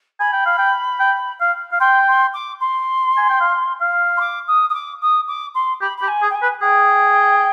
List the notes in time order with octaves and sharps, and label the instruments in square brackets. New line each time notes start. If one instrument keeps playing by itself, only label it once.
[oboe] G#5 [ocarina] B5
[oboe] G5
F5
G5
G5
F5
F5
[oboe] G5 [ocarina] C6
[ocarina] C6
D6
C6
[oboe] G#5
G5
F5
F5
[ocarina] C6
D6
D#6
D#6
D6
D#6
D6
C6
[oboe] G4 [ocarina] B5
[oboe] G4 [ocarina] B5
[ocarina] G#5
[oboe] G#4
[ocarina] G5
G#5
[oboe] B4
[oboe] G#4 [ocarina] G5